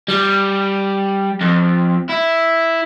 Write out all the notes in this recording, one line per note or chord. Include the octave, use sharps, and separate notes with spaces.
G3
F2
E4